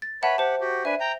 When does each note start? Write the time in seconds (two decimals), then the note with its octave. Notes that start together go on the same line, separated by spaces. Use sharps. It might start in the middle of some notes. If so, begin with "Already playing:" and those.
0.02 A6
0.23 B4 C#5 E5 F#5 A5 B5
0.38 G4 C5 F#5 A5
0.61 F#4 G4
0.85 D4 B4 E5 G#5
1.00 G5 A#5